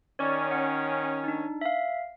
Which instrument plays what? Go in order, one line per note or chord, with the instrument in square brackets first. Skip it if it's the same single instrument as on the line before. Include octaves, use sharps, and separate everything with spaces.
[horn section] D#3 C#4 [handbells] C#5 D5 C#6
[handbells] F#5
D4 D#4
E5 F5